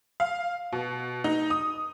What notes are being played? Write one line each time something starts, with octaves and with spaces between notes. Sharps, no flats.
F5
B2
D#4
D#6